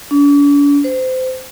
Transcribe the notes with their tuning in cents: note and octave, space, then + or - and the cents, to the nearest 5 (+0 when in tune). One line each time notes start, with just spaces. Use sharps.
D4 -45
C5 -25